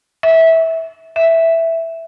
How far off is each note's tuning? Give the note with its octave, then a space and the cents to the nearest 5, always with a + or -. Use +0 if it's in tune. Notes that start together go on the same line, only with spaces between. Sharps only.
E5 -15
E5 +0